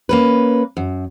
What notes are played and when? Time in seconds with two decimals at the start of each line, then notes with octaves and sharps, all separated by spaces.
0.09 A#3 C#4 B4
0.77 F#2